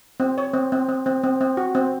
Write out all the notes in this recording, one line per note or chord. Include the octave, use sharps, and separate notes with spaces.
C4
C#5
C4
C4
C4
C4
C4
C4
F#4
C4